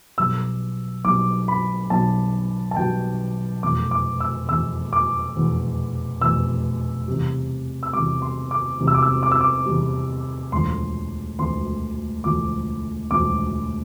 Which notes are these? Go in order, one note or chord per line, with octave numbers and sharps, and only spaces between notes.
B1 B2 G3 E6
B1 B2 G3 D6
B5
B1 B2 G3 A5
A5
B1 B2 G3 G5
F1 E2 B2 D6
D6
E6
F1 E2 B2 E6
D6
F1 E2 B2
F1 E2 B2 E6
E2 C3 G3
E6
E2 C3 G3 D6
C6
D6
E2 C3 G3
E6
D6
E6
D6
E6
D6
E2 C3 G3
E1 D2 D3 F3 C6
E1 D2 D3 F3 C6
E1 D2 D3 F3 D6
E1 D2 D3 F3 D6